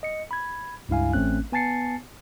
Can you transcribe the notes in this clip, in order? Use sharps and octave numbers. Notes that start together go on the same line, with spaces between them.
D#5 C#7
B5 G#6
C#2 G2 E4 F5 G#5
A1 A3 C4 C#4 F#6
B3 G#5 A5 A6 C7 C#7